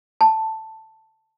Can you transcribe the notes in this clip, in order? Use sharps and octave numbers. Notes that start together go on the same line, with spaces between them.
A5